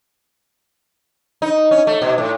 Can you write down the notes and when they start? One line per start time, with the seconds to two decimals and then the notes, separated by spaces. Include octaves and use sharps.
1.42 D#4
1.71 C#4
1.87 A3
2.02 B2
2.18 A2